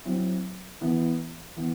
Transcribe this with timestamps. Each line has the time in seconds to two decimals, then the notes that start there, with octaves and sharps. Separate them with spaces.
0.05 F#3 C4 E4
0.81 E3 B3 E4
1.56 E3 B3